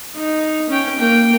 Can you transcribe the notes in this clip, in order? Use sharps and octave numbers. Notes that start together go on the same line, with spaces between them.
D#4
C#4 G5
A#3 G5